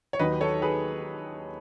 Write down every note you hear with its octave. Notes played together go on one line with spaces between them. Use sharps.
C#5
D#2 D#3 F#3 B4 D#5
A4 C#5
G#4 B4